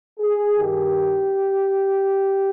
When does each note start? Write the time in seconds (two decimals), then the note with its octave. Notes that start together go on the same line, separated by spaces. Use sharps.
0.18 G#4
0.57 G2 D#3 G4